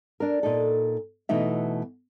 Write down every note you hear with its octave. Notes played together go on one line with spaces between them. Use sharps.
D4 A#4
A#2 D#4 A4
B2 E3 A3 B3 D#4 E5